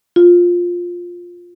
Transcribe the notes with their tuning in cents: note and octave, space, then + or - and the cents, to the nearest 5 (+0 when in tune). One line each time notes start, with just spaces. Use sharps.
F4 +10